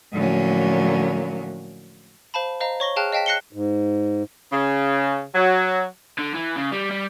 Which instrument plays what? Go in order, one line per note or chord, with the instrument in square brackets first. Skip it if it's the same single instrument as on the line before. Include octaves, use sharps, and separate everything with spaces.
[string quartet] A2 D3 F3 F#3 A#3 C#4
[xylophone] C5 F5 A5 B5
C5 D#5 F5 A#5
C#5 C#6 A#6 G7
G#4 F5 G5 A5 F6 F#6
D#5 F5 G5 A5 B6
F#6 A#6 C7 C#7 E7 G7
[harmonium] G#2
[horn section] C#3
F#3
[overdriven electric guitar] D3
E3
C#3
G3
G3